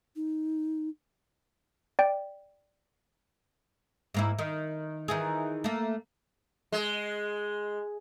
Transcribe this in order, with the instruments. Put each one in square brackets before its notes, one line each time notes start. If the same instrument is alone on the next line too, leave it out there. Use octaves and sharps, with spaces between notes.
[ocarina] D#4
[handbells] D5 G5
[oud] G#2 A#3 E4
D#3
D#3 E3 G#4
A3 A#3
[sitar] G#3